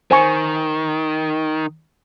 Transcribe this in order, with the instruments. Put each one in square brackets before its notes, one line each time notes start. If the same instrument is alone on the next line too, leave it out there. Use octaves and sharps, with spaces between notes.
[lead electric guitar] D#3 [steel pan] C5 G#5 C#6